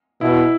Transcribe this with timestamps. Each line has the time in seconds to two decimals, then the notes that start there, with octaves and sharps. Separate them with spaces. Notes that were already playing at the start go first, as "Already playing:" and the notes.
0.21 B2 E4